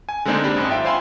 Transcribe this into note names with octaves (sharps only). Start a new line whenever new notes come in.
G#5
D3 G#3 A#3 C4 D4 D#4
D4 G4 B5
G#1 F#2 D4
F4 E5 G5
C5 E5 F5 G#5 B5 C6